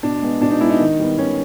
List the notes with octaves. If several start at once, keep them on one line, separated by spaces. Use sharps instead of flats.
B2 D4
G#3 B3
B2 D4
D#4
G#3 B3 E4
D#4
D#3
G3 B3
D#3 C#4